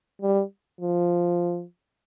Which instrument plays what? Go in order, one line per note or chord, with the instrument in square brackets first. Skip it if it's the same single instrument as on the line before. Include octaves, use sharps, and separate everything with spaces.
[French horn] G3
F3